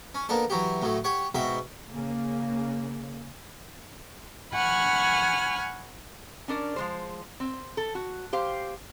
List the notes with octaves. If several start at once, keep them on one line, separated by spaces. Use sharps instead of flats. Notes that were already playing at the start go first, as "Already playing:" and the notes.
C#4
A#3 B3 D4 A4
E3 F#3 F#4 G4
A2 F#3 A3
G4 C#5 F#5 C#6
G#2 B2 F#4 E5 G5
C#3 A#3
F#5 G#5 B5 C#6 F6
C#4 D4 A#4 D5
F3 G#3 C5
C4
A4
F#4
G4 C5 F5